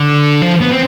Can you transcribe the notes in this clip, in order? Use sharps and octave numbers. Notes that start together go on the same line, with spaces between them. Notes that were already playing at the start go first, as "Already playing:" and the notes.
Already playing: D3
F3
B3
C4